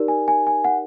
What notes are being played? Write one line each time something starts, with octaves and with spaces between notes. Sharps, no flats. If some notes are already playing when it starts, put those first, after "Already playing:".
Already playing: D#4 G4 A#4 D5
G#5
G#5
G#5
F#5